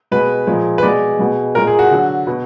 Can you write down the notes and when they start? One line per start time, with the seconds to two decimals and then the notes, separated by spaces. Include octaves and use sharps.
0.12 B2 G#3 B4
0.47 A#2 F3 G#3
0.78 B4
0.83 B2 G#3 D5
1.19 B2 G#3
1.55 A#2 G#3 A#4
1.67 G#4
1.79 F#4
1.91 D3 F#3
2.27 B2